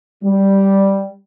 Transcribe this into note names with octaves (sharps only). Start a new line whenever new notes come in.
G3